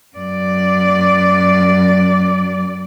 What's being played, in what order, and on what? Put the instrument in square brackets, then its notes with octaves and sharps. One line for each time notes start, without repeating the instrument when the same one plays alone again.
[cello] F#2 D5